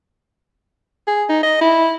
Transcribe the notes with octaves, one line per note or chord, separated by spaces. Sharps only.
G#4
D#4
D#5
E4